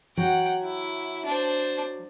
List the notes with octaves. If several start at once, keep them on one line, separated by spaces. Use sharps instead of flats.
F#3 F#5 G5
E4
D4 C5